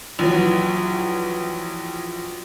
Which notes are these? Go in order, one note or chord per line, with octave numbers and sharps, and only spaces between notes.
A#1 E3 F#3